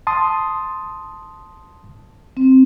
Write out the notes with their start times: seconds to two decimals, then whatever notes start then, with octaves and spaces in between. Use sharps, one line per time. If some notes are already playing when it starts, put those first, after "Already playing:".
0.07 A5 C6 D#6
2.37 C4